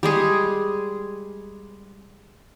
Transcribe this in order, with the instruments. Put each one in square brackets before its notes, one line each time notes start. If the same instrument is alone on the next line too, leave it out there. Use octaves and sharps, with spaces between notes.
[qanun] G3 G#3 G#4